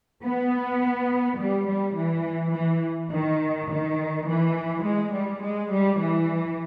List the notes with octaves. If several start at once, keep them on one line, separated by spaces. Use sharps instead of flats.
B3
G3
G3
E3
E3
D#3
D#3
E3
G#3
G3
G#3
G3
E3